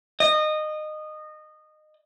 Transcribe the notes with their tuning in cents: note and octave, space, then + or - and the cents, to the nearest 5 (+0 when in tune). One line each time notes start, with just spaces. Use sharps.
D#5 -20